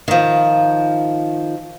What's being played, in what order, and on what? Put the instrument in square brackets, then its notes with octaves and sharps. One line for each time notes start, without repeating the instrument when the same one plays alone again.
[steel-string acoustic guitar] D#3 F3